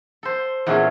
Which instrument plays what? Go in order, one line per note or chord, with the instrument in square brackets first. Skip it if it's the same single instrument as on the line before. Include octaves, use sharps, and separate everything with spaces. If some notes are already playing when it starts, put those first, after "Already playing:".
[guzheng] A4 C5
E2 A#2 A3 C#4 G#4